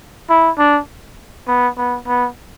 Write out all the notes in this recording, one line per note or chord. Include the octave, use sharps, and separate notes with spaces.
E4
D4
B3
B3
B3